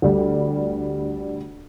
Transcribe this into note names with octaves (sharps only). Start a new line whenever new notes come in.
D2 G3